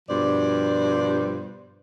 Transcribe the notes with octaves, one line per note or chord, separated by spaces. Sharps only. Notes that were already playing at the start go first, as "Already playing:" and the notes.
G2 B2 F3 C5 D5